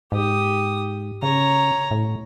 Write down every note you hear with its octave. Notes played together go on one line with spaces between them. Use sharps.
G#2 G4 D#6
C#3 C#5 A#5
A2